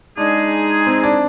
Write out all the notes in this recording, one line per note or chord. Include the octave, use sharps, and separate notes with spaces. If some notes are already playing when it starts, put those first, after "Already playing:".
G#3 D4 D#4 G#4
C4
D4